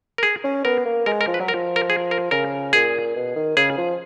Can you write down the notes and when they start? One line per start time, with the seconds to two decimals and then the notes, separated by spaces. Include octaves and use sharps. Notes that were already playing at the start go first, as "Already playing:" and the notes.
0.18 A#4
0.23 G#4
0.44 C#4
0.65 B3 A#4
0.85 A#3
1.06 G#3 A#4
1.21 A#4
1.28 F3
1.34 B4
1.40 F#3
1.48 A#4
1.53 F3
1.76 A#4
1.90 G#4
2.11 A#4
2.31 C#3 A#4
2.73 A#2 G#4
3.15 B2
3.36 D#3
3.57 C#3 G#4
3.78 F3